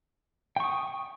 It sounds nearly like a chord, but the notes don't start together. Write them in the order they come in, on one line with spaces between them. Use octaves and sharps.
G5 C#6 D#6